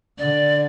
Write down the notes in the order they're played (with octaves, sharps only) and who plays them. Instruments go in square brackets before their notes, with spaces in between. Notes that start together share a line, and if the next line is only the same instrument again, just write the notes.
[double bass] D3 [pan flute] D5